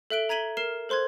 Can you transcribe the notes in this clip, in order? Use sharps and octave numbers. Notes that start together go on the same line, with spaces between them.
A4 E5 F#6 D7 G7
A#5 G#6 B6 D#7 F#7 G7
A#4 F6 C7 E7
A4 C5 C6 F#6 G#6